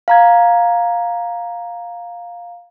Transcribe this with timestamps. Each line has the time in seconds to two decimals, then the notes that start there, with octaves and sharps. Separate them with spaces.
0.08 F5 A#5 G#6